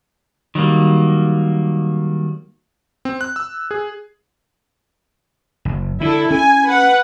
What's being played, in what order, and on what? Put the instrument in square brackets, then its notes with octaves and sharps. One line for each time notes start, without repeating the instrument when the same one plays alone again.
[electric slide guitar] D#3 F#3 G3 A#3
[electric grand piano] C4
F#6
E6
G#4
[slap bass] F#1
[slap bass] D3 [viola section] E4 A4
[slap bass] C#4 [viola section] G#5
[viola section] B4 F#5